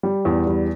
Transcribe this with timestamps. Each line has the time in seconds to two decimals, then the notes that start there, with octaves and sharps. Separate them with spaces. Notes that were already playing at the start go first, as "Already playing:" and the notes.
0.03 G3
0.25 E2
0.47 G3